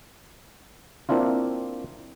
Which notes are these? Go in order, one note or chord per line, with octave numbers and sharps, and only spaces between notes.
A#3 C4 D4 E4 F4